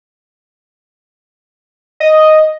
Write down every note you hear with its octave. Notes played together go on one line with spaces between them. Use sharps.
D#5